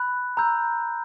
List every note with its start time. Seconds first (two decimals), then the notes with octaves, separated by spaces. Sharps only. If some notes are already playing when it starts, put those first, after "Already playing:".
Already playing: B5 F#6
0.37 A#5 E6 G6